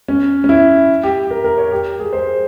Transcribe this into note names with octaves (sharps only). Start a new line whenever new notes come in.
C#4
C#4
E4
G4
A#4
A#4
C#5
G4
G#4
C5